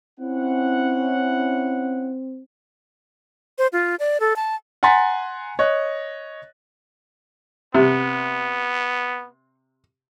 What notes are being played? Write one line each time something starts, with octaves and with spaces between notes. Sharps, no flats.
C4 C#4 E4 F#5
C5
F4
D5
A4
A5
F#5 G#5 A#5 C6 A6 B6
C#5 D#5 F#6
C3 B3